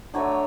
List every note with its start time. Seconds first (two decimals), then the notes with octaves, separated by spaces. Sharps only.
0.14 D3 F#3 A3 C#5